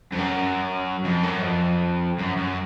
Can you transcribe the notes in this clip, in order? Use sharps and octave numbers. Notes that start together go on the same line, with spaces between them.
F2
F#2
F2
F#2
F2
F#2
F#2